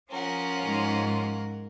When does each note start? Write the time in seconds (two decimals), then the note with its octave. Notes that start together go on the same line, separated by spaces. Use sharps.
0.11 F3 C#4 F4 A#4 F#5
0.61 G#2